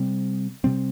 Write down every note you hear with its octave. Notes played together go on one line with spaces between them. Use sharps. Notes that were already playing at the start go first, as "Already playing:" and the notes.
Already playing: C3 G3 C4
C3 G3 C4